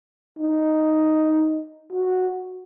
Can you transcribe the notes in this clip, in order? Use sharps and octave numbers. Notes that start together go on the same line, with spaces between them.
D#4
F#4